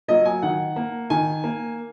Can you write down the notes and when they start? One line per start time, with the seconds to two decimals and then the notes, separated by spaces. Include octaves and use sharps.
0.08 F#3 A#3 D#5
0.25 G#5
0.42 D#3 F#5
0.76 A#3
1.10 D#3 G#5
1.44 A#3